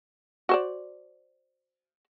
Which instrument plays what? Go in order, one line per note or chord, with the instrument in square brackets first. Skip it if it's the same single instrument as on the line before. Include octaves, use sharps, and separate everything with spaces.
[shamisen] F#4 C5 D5